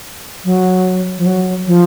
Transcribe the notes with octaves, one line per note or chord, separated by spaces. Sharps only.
F#3
F3
F#3
F3